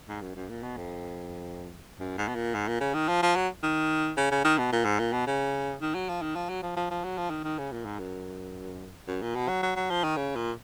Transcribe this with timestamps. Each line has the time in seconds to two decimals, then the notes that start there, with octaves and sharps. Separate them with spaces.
0.09 G#2
0.22 F#2
0.36 F#2
0.50 A#2
0.63 B2
0.77 F2
1.99 F#2
2.18 G#2
2.28 B2
2.35 A#2
2.54 G#2
2.68 A#2
2.81 C#3
2.94 D#3
3.08 F3
3.22 F3
3.36 F#3
3.63 D#3
4.17 C#3
4.31 C#3
4.45 D#3
4.58 B2
4.73 A#2
4.85 G#2
4.99 A#2
5.13 B2
5.27 C#3
5.81 D#3
5.95 F#3
6.09 F3
6.22 D#3
6.36 F3
6.49 F#3
6.63 F3
6.76 F3
6.91 F3
7.04 F#3
7.18 F3
7.30 D#3
7.44 D#3
7.58 C#3
7.72 A#2
7.85 G#2
7.99 F#2
9.08 F#2
9.22 A#2
9.35 B2
9.49 F#3
9.63 F#3
9.76 F#3
9.90 F3
10.04 D#3
10.17 C#3
10.36 A#2